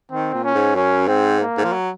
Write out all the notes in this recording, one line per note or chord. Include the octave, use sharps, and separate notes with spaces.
D#3 C4
A#2
C#4
G#2
F#2 C#4
G#2 C4
A#3
G#2
F3
F#3